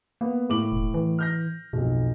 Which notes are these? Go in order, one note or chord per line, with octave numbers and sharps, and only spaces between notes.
A#3 B3
A2 D6 F#7
E1
E3
F6 G6 A#6
B1 F2 B2